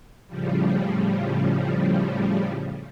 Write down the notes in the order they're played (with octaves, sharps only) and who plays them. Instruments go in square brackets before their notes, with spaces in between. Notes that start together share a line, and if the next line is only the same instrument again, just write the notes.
[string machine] A2 C#3 F3 G3